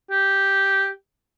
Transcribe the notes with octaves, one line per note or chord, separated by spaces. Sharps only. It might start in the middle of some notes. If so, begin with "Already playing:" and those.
G4